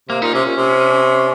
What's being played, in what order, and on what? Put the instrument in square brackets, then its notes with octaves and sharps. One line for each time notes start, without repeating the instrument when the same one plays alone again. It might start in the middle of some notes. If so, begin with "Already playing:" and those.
[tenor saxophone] C3 [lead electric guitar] A#3
[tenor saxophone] A#2 [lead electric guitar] D#4
[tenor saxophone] C3 [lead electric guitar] C#4
[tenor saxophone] A#2
C3